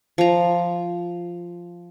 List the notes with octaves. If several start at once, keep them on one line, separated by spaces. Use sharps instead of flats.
F3 A#5